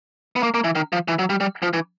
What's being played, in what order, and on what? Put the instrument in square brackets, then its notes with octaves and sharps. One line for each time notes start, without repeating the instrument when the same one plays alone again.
[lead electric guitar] B3
A#3
A#3
E3
D#3
F3
E3
F#3
G3
G3
F3
E3